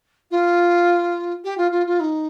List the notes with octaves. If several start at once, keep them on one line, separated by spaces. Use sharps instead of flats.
F4
G4
F4
F4
F4
D#4